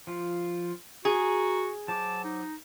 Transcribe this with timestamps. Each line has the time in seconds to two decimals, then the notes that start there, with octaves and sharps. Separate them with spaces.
0.07 F3 F4
1.05 F#4 G#4 A#5
1.88 F#3 C5 A5 D6
2.24 D#4